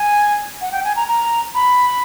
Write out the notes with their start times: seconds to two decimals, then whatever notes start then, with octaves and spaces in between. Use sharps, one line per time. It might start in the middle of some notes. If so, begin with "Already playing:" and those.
Already playing: G#5
0.61 F#5
0.72 G5
0.84 G#5
0.96 A#5
1.08 A#5
1.55 B5